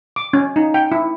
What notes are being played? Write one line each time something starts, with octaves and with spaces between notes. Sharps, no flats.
D6
C#4
D#4
G5
E4